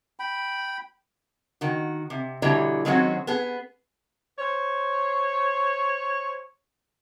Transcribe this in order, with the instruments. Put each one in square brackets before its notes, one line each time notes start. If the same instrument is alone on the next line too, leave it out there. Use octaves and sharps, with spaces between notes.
[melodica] G5 B5
[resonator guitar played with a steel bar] D#3 F#4
C3
B2 D3 E3 G3 C#5 A#5
D#3 F#3 G#3 C4 C#4 F#4
B3 G#4
[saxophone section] C5 C#5